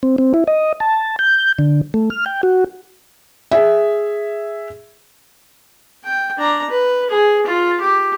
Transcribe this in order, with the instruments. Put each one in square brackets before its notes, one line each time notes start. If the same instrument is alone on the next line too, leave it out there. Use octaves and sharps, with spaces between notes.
[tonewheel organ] C4
C4
E4
D#5
A5
G6
D3
A3
F6
G5
F#4
[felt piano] G#4 E5
[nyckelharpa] G5
D4 A#5
B4
G#4
F4
G4